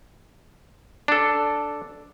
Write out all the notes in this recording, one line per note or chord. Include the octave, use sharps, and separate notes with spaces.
D4 A4